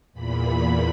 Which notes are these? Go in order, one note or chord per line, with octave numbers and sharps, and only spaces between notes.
E2 A#2 B5